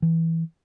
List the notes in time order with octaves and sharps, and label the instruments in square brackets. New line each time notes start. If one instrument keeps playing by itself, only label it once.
[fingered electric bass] E3